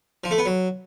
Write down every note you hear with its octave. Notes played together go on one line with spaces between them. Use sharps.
F3
A3
B3
F#3